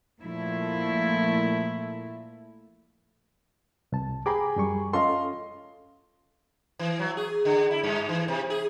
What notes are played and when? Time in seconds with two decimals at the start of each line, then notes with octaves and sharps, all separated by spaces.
0.21 A#2 F3 A3 E4
3.92 C2 A5
4.26 G#4 G5 A#5 B5 D6
4.56 F#2 G3 C#6
4.93 C#4 F4 A4 D#5 F5 C6
6.79 E3
6.99 F#3
7.17 G#4
7.45 D3
7.71 E4
7.83 G2
8.09 E3
8.28 C3
8.50 G#4